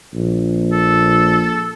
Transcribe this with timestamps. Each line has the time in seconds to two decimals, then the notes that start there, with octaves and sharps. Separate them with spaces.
0.14 A#1
0.72 A4